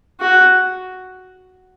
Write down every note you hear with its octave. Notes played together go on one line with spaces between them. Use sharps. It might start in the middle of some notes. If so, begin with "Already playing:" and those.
F#4